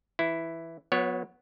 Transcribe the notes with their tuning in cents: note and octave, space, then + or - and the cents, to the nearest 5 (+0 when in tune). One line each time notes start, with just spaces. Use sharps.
E3 +0 E4 +0
F#3 -40 B3 +0 C#5 +0